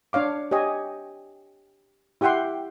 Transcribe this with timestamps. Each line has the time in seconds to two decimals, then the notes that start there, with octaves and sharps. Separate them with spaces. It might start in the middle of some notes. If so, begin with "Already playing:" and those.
0.13 D4 C#5 F5 D6
0.51 G4 C#5 D#5 G#5
2.21 E4 G4 E5 F#5 G5 C6